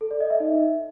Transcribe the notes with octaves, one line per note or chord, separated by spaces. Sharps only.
A4
D5
D#5
E5
D#4